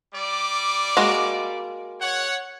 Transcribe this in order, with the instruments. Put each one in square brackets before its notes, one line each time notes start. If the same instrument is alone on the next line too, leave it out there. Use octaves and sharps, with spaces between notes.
[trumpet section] G3 D5 D6
[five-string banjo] G#3 A#3 F#4
[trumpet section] C#5 F#5